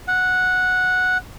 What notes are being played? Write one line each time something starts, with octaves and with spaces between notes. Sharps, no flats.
F#5